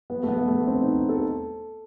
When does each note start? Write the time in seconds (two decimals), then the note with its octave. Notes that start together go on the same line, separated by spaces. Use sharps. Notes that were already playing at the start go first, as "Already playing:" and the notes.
0.10 B3
0.23 A3
0.28 B3
0.48 A3
0.67 C4
0.81 D#4
1.09 A4